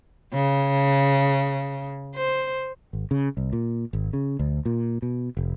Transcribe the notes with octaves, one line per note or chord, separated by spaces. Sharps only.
C#3
C5
G#1
C#3
C2
A#2
G#1
C#3
D2
A#2
B2
F1